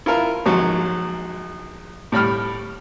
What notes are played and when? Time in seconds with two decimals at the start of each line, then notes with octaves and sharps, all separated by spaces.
0.06 E4 F4 A#4
0.46 A#1 G#2 F#3
2.12 A2 G3 B5 F6